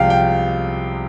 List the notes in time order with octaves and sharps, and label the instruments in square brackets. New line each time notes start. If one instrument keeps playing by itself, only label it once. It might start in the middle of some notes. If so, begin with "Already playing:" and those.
Already playing: [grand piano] C2 C3 F3 G#3 F5 G5
G5